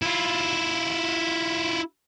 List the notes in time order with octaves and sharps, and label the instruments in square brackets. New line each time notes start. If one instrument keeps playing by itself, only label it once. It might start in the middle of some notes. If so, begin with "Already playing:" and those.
[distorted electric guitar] E4 F4